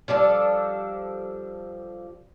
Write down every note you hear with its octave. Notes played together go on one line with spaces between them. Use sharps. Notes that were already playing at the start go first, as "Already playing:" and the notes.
F3 G3 D4 A4